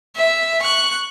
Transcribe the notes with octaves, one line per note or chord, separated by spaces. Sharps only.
E5
C#6 F#6